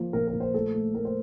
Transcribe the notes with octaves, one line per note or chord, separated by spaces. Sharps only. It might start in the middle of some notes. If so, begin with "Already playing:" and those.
Already playing: F3 A#3
A#2 A#4
A#4
A#2
C5
A3 A4
A3
A3 A#4
C5